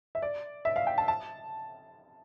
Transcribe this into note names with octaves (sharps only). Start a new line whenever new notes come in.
E5
D5
E5
F5
G5
A5
A5